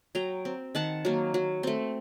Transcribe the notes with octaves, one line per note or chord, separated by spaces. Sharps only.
F#3 G5 A#5
C4
D#3 F#5 A5
F#3 A#3
F#3
A3 C4